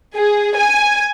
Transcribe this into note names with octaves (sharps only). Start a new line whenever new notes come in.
G#4
G#5